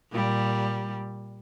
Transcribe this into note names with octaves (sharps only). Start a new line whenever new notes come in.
A#2 G3